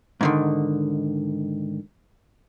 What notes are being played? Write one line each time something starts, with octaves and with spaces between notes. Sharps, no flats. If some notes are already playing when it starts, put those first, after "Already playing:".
G#2 D3 D#3